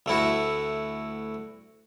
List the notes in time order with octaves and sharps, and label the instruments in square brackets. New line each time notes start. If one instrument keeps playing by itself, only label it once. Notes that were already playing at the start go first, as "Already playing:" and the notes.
[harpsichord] D2 A3 E4 F#4